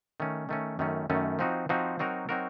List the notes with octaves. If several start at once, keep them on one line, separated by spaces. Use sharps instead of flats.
D#3 A3 C#4
D#3 A3 C#4
F#2 D#3 A3 C#4
F#2 D#3 A3 C#4
F3 C4 D#4 F#4
F3 C4 D#4 F#4
F#3 C4 D#4 F#4 A#4
F#3 C4 D#4 F#4 A#4